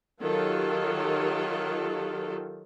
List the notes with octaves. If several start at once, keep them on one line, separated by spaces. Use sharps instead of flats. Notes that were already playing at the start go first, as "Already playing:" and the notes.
D#3 F#3 F4 G4 A4